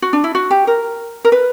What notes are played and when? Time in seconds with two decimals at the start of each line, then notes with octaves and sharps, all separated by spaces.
0.02 F#4
0.13 D4
0.24 E4
0.35 F#4
0.51 G4
0.67 A#4
1.25 A#4
1.32 B4